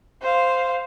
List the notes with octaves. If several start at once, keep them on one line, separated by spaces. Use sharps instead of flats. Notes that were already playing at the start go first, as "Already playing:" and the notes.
C5 F5